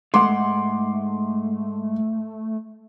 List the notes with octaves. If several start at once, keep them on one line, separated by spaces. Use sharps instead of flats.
G#2 G#3 A3 F#5 C6 D6